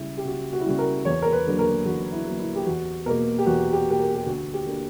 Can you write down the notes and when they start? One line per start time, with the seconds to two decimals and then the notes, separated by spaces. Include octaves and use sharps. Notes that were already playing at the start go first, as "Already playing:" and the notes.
Already playing: C#3 G3 E4
0.17 G4
0.25 C#2 F#4
0.53 F#4
0.60 E4
0.65 C#3 G3 F#4
0.79 A#4
1.05 E2 C#5
1.22 A#4
1.33 B4
1.46 D3 F#3 A#3
1.59 A#4
1.85 E2 F#4
2.12 E4
2.27 D3 F#3 A#3
2.39 E4
2.56 G4
2.66 E2 F#4
3.06 B2 A#3 A#4
3.39 G4
3.46 E2 F#4
3.73 G4
3.86 B2 A#3 G4
4.00 A#4
4.15 G4
4.26 D2 F#4
4.54 G4
4.66 D3 A#3